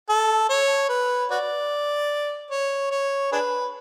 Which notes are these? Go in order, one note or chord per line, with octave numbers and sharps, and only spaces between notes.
A4
C#5
B4
F#4 B4 D5
C#5
C#5
D4 G#4 B4